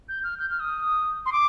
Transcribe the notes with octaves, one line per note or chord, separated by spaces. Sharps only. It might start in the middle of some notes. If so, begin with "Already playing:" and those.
G6
F6
G6
F6
D#6
C6
D6